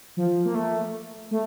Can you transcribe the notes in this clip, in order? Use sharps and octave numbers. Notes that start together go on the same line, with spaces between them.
F3
A#3
A3
A3